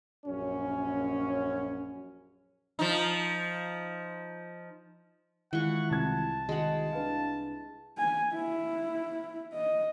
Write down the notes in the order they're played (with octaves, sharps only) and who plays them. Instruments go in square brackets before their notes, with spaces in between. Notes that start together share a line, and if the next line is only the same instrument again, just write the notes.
[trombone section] A#1 F#2 C#4
[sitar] F3 D#4
[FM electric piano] D#3 G#3 F4 [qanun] E3 C#6 [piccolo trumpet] F#5
[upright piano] C2 G#6 [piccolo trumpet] A5
[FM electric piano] D#3 F#4 [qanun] G#3 F#5
[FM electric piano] D4 B4 F5
[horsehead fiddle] G#5
E4
D#5